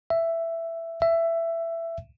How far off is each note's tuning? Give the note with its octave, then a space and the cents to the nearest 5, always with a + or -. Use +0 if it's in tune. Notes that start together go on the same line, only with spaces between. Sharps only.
E5 +10
E5 +15